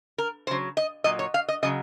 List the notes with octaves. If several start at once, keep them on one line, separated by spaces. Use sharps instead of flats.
A#4
C#3 F#3 C5
D#5
A#2 F#3 D#5
C#5
F5
D#5
C#3 F#3 D#5